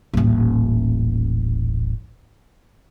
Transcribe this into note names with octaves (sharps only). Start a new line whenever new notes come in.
D#1 A1